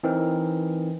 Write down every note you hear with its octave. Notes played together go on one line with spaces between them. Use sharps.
E3 C4 D#4 A#4